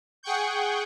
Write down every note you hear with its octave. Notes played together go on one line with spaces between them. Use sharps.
G#4 F#5 G5 C#6 G6